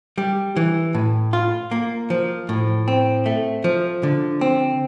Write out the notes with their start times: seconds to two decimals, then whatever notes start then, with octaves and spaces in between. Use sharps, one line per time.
0.18 G3
0.56 E3
0.94 A2
1.33 F4
1.71 A#3
2.10 F3
2.49 A2
2.88 C4
3.26 A3
3.64 F3
4.03 D3
4.41 C4